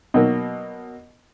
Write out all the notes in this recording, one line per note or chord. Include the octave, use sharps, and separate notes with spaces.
B2 F#3 A#3